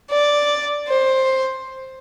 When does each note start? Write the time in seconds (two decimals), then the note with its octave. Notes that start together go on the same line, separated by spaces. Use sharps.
0.10 D5
0.88 C5